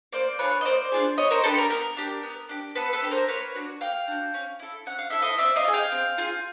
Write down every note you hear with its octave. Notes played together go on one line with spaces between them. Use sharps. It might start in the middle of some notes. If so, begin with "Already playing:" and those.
A#3 C5 D5
D4 F4 G#4 B4 C#5
D#5
A#3 C5 D5
D4 F4 G#4
B3 C#5 D#5
A#4 C5
D4 G4 A4 B4
A#4
B3 A#4
D4 G4
B3
D4 G4
B3 A4 B4
A4 B4
D4 G4
A#4 C5
A#3 B4 C#5
D4 F#4
A#3 F5 G5
D4 F#4
C#4
E4 A4
C#4 F#5
F5
E4 A4 E5
D#5 F5
C4 D5 E5
D#5 F5
F4
G#4
F5 G5
C4
F4 G#4